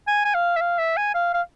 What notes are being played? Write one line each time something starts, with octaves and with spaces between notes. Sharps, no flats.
G#5
G#5
F5
E5
F5
E5
G#5
F5
F5